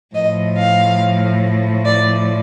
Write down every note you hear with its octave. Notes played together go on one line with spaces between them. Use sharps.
A2 F3 D#5
F5
D5